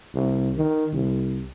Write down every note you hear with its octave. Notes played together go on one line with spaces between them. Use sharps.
C2
D#3
C2